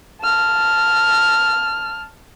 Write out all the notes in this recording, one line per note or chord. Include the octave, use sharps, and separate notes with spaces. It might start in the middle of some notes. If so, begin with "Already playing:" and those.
A5 F6